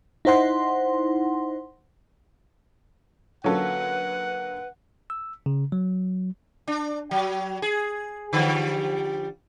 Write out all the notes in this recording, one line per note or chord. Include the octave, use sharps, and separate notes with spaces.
D#4 E4 C5 F#5 C6
D3 F#3 A#3 C#4 F4 A4 B4 F#5
E6
C#3
F#3
D4
F#3
G#4
D3 F3 G3